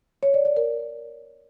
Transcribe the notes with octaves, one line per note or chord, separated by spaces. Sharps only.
C#5
D5
D5
A#4